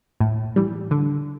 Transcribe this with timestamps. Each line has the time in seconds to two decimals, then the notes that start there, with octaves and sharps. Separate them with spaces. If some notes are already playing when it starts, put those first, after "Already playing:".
0.20 A2
0.56 E3 G3
0.91 D3